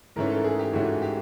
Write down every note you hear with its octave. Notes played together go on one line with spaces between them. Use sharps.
G#2 E3 A3 C#4 A#4
A4
G#4
G4
G#2 E3 A3 C#4 F#4
G4